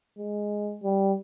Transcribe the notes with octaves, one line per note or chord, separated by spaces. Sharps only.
G#3
G3